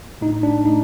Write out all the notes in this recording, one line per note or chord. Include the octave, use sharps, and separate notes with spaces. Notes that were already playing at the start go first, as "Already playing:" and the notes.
A2 A3 D4 D#4
D4
A2 A3 D4 D#4